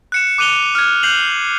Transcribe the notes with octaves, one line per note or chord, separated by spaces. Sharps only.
F#6 C#7 E7
D6 F#6 D#7 F7 G7
F6 G#6
F#6 G6 C7 F7 F#7